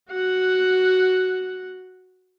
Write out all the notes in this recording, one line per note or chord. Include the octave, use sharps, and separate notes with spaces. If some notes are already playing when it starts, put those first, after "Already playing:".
F#4 F#5